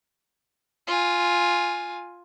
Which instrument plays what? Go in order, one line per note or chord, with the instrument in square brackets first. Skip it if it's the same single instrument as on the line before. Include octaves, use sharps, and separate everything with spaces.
[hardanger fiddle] F4 G#5